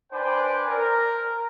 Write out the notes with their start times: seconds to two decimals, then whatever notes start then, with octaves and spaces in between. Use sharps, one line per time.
0.12 D4 B4 C5 D5 G5 G#5
0.68 A#4